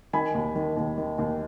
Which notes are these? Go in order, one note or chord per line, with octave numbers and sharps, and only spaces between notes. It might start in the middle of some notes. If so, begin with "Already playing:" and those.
D#3 G#5 B5
D#2
D#3
D#2
D#3
D#2